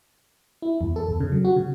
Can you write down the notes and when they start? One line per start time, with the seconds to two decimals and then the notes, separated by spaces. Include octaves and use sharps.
0.62 E4
0.81 E2
0.96 A4
1.08 E2
1.20 C#3
1.32 F#3
1.45 F#4
1.56 C#3